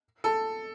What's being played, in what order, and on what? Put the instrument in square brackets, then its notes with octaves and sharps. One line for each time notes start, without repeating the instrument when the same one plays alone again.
[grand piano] A4